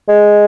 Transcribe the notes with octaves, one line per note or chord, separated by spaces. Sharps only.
G#3